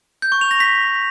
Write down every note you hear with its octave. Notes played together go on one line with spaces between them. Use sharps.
G6
C#6
F7
A#6
B6